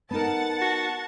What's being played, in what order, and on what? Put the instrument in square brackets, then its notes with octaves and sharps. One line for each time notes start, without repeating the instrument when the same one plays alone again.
[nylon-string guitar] B3 D#4 A#4 [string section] F#5 A5
[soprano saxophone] F#4